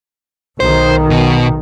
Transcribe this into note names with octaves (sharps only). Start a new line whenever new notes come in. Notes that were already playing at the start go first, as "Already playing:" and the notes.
B1 D#3 C5
B2